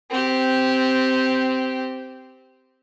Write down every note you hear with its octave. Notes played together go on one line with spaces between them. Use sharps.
C4 G4